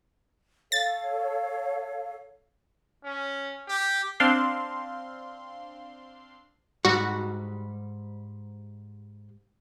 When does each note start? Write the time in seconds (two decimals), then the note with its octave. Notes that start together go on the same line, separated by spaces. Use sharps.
0.72 A4 C#5 F5 A6
3.05 C#4
3.68 G4
4.20 C4 D4 F5 C6
6.85 G#2 G3 F#4